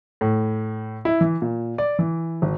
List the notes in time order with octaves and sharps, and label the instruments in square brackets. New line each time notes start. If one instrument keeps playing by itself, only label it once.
[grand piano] A2
E4
E3
A#2
D5
E3
G#1